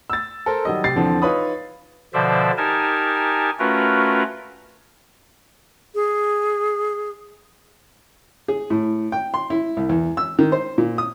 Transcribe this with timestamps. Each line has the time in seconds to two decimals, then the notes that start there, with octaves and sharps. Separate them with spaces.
0.10 E6 A6
0.46 A4 A#4 C5
0.65 D#3 F#3 G3 D#5
0.84 C3 A6 C7
0.96 E2 D3 F3 C4
1.22 D#4 F4 B4 C#5 B5 D#6
2.14 B2 D3 F3 C5 D5 E5
2.58 D#4 G4 A#4 G#5 A5
3.59 A3 C#4 F4 F#4 A#4 B4
5.95 G#4
8.48 G#4
8.70 A2
9.12 G5
9.34 C6
9.50 E4
9.77 C2
9.89 E2
10.17 E6
10.39 D#3
10.52 C5
10.78 A#2
10.98 D#6